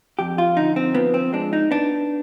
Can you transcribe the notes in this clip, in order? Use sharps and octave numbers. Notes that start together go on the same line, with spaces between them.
F2 G4
F4
D3 D#4
C4
F3 B3
C4
G#3 D4
D#4
B3 D4